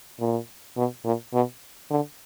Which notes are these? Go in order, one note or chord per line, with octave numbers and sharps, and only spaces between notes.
A#2
B2
A#2
B2
D3